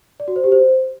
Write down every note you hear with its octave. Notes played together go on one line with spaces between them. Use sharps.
D5
F#4
C5
G4
C5